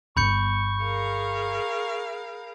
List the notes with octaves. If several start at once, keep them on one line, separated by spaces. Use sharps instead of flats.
D1 G1 B5 C#6 G6 C#7
G#4 A#4 F5